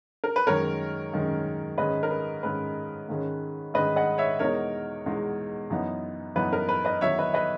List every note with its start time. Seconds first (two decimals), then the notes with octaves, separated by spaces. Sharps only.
0.24 A#4
0.36 B4
0.47 F#2 D#3 G#3 C#4 A#4 C#5
1.13 F#2 D#3 G#3 C#4
1.78 G#2 D#3 G#3 C#4 B4 D#5
2.03 A#4
2.11 B4
2.43 G#2 D#3 G#3 C#4 B4
3.09 G#2 D#3 G#3 C#4
3.74 G#2 D#3 G#3 C#4 B4 D#5
3.96 D#5 F#5
4.18 C#5 E5
4.39 E2 B2 G#3 D#4 A#4 C#5
5.06 E2 B2 G#3 D#4
5.70 F#2 E3 B3 D#4
6.36 F#2 E3 B3 D#4 B4
6.53 A#4
6.69 B4
6.85 B4 D#5
7.01 E2 D#3 F#3 C#5 E5
7.19 B4 D#5
7.34 B4 D#5